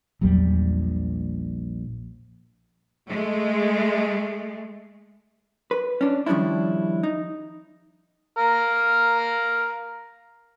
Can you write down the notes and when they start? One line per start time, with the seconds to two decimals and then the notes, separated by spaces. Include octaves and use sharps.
0.21 A#1 E2 F#3 G3
3.08 G#3 A3
5.71 B4
6.01 C#4 D4
6.26 D#3 F3 G3 C#4 D4 E4
7.03 D#4
8.37 A#4 F5